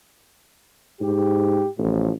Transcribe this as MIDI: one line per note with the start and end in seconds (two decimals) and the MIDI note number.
1.01 1.63 44
1.01 1.68 67
1.79 2.11 33
1.79 2.09 45
1.79 2.09 53